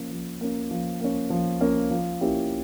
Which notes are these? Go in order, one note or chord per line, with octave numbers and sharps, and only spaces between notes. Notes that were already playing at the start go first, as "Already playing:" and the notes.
Already playing: F3 A#3 C#4
F3
A#3 C#4
F3
A#3 C#4
F3
A#3 C#4
F3
A#3 C#4 E4 G4